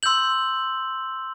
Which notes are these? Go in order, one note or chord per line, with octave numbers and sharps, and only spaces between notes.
C6 E6 G6 F#7